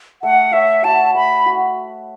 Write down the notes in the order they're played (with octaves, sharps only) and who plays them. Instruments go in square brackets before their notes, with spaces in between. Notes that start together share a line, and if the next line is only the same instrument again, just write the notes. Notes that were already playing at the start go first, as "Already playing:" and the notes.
[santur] A3 [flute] F#5
[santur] C#5 [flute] E5
[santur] F#4 [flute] A5
[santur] A3 [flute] B5
[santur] F#4